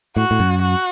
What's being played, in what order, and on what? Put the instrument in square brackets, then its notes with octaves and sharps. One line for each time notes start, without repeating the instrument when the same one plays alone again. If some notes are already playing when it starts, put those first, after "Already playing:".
[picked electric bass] A2 [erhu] F#4
[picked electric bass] A2
F#2
[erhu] F#4